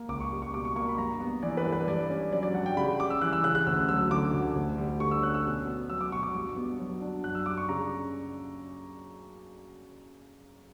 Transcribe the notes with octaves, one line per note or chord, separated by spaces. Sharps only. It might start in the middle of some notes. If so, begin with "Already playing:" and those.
Already playing: A#3
C#2 D6
C#6
G3
C#6
B2 D6
C#6
A#3 C#6
B5
G2 A#5
B3
E3 D5
B4
G2
B4
G2 D5
C#4
F#3 D5
D5
G2 F#5
G5
C#3 B5
B5
G3 D6
E6
E3 F#6
E6
C#3 F#6
F#6
D2 E6
F#3 E6
D3 D6
D2
D2
G3
D3 C#6
E6
C#4 F#6
E6
B2
B3
F#3 E6
D6
B2 C#6
D6
G2
B3
F#3
D4
F#2 F#6
E6
G3 D6
C#6
C#3 A#5